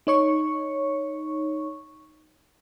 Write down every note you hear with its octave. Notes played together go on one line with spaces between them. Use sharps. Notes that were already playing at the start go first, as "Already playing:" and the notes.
D#4 C#5 C#6